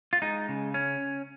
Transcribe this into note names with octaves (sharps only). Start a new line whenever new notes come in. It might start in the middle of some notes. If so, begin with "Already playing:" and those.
F4
G#3 D#4
C#3
C#4